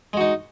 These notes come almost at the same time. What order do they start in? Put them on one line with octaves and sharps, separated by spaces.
G#3 F#4 D#4